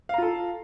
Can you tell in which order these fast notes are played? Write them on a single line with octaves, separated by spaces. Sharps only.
F5 A#5 F4 A4